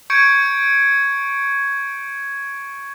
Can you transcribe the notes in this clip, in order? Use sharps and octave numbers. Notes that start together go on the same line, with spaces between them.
C#6 G6 G#6 C#7 D7